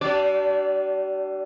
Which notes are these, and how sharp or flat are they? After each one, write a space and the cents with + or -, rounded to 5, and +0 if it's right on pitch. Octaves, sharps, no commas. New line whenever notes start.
G3 -45 D4 +0 D5 -30